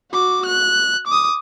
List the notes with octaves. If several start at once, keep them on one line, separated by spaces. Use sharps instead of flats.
F#4 D6
F#6
D6 D#6